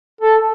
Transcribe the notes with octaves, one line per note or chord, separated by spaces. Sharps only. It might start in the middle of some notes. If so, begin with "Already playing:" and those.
A4